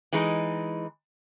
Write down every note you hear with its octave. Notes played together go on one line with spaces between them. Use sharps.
E3 G#3 D#4